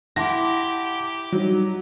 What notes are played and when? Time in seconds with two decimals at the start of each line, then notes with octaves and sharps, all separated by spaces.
0.16 E4 G4 F#5 A5 C6 A#6
1.32 F#3 G3 D#4